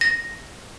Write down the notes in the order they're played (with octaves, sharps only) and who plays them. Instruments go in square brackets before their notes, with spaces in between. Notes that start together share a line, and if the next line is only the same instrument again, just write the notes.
[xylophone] A#6